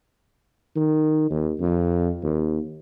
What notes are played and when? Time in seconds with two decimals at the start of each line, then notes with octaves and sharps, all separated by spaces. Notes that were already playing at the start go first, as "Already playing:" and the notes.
0.76 D#3
1.30 D#2
1.60 F2
2.23 D#2